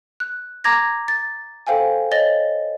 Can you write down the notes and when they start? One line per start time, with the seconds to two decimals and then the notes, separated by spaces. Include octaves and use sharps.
0.20 F#6
0.64 A#5 D6 G#6 A#6
1.08 A6
1.67 A4 C5 F5 G5 G#5
2.11 C#5 D#5 A6 G7